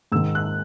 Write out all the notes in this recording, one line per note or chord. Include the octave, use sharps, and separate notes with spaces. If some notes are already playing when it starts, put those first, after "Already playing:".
G#2 D#3 E6
F#6